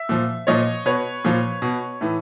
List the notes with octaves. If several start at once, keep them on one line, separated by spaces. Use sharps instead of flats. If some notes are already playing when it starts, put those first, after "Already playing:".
Already playing: E5
A#2 F3
A#2 F3 C#5 D#5
B2 B4 C#5
A#2 F3
B2
A2 E3